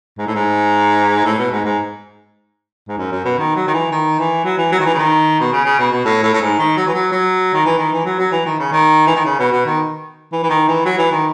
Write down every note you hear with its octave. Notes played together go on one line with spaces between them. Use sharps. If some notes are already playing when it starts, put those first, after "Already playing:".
G#2
A2
G#2
A2
B2
G#2
G#2
G#2
F#2
F#2
B2
D#3
F#3
D#3
E3
D#3
E3
F#3
E3
F#3
D#3
E3
C#3
D#3
B2
C#3
C#3
B2
B2
A2
A2
A2
G#2
D#3
F#3
E3
F#3
F#3
D#3
E3
D#3
E3
F#3
F#3
E3
D#3
C#3
D#3
E3
D#3
C#3
B2
B2
D#3
E3
E3
D#3
E3
F#3
E3
D#3